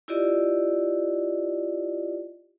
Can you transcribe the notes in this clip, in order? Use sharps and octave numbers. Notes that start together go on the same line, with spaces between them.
E4 F4 G4 D5 D#5